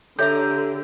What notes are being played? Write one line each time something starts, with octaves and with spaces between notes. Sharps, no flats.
D3 G4 A4 C#5 E5 A#5 G6